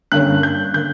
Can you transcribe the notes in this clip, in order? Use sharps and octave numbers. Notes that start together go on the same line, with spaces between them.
G2 D3 A#3 C#4 F#6
G6
D3 A#3 G6